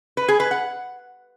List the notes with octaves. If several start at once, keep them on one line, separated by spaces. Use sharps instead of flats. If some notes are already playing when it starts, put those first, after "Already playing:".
B4
G#4
B4
F#5